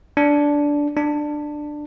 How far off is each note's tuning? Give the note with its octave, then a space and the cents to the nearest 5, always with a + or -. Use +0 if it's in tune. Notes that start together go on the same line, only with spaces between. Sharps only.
D4 -10
D4 +15